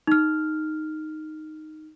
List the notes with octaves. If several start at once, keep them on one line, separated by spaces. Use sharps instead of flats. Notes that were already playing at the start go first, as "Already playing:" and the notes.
D#4 F6